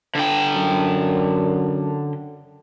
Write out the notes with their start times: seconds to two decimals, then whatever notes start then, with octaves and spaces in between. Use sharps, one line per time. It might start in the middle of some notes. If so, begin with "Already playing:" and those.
0.15 D3 G5
0.54 F#2